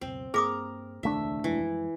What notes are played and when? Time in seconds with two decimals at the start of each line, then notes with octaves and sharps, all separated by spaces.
0.01 C#2 F#2 B2 C4
0.34 G2 A#3 C4 G#4 A#4 D6 D#6
1.03 E1 C#2 D#3 A3 D4 E5
1.44 F#2 E3 F3 G#3